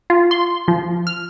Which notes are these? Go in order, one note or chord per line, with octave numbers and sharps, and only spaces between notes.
F4
C6
F3
F6